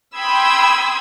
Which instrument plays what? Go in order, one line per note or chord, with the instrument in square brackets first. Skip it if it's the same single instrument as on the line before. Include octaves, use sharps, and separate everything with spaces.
[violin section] G5 B5 C6 D#6 E6 G#6